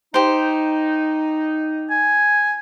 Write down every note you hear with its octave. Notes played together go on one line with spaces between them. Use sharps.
D#4 G4 C5
G#5